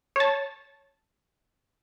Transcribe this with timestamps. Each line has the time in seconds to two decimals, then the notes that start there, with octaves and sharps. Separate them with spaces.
0.16 C#5 A5